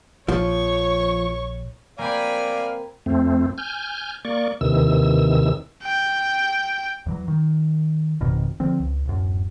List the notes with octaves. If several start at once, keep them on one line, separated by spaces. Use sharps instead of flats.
A#1 F3 C#5 C#6
A#3 C4 D5 F5 G#5 B5
F2 A3 C4
G#5 F6 G6
A#3 D5 C#6
D#2 C3 D#3 E3 E6
G5
E2 E3 F#3
D#3
G#1 F2 B2 D#3
D3 F3 C4
C#2
D1 F#2